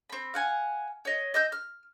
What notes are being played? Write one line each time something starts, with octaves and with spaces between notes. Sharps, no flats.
C4 B5
F5 F#5 G#5
C#5 D#5
D#5 E6 G6
F6